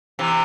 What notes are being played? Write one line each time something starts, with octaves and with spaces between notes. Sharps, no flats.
C3 E3